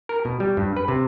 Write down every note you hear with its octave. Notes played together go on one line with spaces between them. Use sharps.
A#4
B2
G3
G2
B4
C3